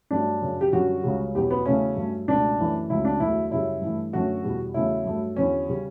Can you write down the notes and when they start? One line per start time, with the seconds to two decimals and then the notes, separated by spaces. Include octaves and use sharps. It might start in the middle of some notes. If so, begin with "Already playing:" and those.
0.11 G2 F#3 A3 D4
0.42 F#2 C#3 F#3
0.61 G4
0.73 F#2 D3 G3 F#4
1.04 C#2 C#3 G3
1.34 E2 B2 F#3 G4
1.51 B3
1.66 E2 C#3 F#3 A3 C#4
1.96 G2 F#3 A3
2.28 C#2 B2 A3 D4
2.59 F#2 E3 A3
2.90 C#2 C#3 F#3 A3 E4
3.05 D4
3.20 E2 D3 F#3 A3 E4
3.51 F#2 C#3 G3 E4
3.81 G2 E3 A3
4.13 F#2 D3 F#3 A3 F#4
4.44 E2 B2 G3
4.74 E2 C#3 F#3 A3 E4
5.05 G2 F#3 A3
5.36 E2 D3 F#3 C#4
5.69 C#3 G3